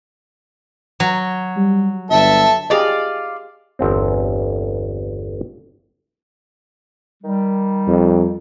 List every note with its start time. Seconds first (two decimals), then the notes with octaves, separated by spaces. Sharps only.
1.00 F#3
1.57 G3
2.11 G1 A4 E5
2.70 F4 G4 G#4 D5 D#5 F5
3.79 G1 E2 C4
7.23 D#3 G3
7.88 F2